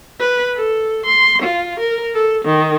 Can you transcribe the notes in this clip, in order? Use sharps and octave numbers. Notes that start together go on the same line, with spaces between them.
B4
A4
C6
F4
A#4
A4
D#3